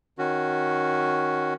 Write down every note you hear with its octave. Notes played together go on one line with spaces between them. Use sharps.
D#3 C#4 F#4